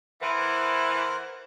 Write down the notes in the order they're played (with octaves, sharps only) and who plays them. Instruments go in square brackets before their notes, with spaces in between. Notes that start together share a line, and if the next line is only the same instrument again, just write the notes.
[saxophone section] E3 [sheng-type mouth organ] A#4 C5 F#5